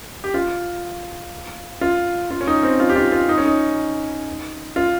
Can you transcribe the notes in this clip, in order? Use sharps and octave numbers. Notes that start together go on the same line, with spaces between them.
G4
F4
F4
F4
C#4
D#4
C4
F4
G4
F4
F4
D#4
C#4
D#4
F4